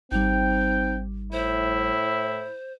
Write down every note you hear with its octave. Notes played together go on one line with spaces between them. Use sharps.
G#1 G3 C4 D#4 G5
A2 E4 C5